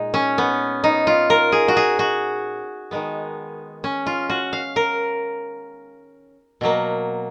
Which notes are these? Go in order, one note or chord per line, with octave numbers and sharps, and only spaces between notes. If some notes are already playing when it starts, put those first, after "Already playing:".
Already playing: A#2 G#3 D#4
C#4
B3
D#4
F4
A#4
G#4
F#4
G#4
F#4
D#3 G#3 B3
C#4
F4
F#4
F5
A#4
B2 F#3 A#3